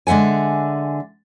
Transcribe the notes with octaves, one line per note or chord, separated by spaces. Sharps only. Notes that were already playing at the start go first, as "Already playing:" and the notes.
D3 G#3 E5 F#5 G#5